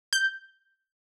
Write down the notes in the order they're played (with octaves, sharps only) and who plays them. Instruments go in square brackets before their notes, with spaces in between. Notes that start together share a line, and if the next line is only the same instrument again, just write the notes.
[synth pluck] G6